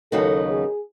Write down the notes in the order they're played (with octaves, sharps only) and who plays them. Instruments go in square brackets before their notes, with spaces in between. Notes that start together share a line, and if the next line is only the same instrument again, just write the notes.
[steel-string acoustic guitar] D#2 C#3 F#3 B3 D#4 [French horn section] A4
[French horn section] G#4